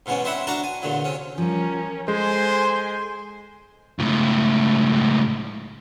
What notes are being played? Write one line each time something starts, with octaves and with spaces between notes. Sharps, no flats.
G#2 B2 E3 B3 C#4
C4 D4 E4 E5 F#5 B5
D4 F#4 A#4 F#5 A5 A#5
G#5
E2 A#2 D3 F#3
C3 C#4
F3 G3 C#4 A#4
G#3 A4 C5 G#5 C6
C#2 A2